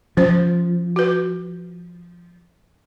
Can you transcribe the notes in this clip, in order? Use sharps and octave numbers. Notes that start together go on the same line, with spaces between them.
F3 C#4 C5
F#4 B4